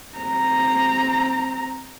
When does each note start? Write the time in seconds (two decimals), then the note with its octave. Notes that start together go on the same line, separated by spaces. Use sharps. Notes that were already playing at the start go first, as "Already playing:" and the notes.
0.16 C4 A#5